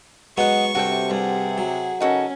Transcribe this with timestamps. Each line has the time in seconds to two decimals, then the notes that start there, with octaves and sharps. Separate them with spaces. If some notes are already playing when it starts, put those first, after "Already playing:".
0.37 F#3 G#3 B3 D#5 F#5 C#6
0.75 G2 C3 F#4 A4 G5
1.10 G2 G#4 F#5
1.58 F#3
2.00 C#3 C#4 D#4 F#4 A4 A#4